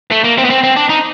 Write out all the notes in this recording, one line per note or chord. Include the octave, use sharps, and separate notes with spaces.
A3
A#3
C4
B3
C4
C4
D4
D#4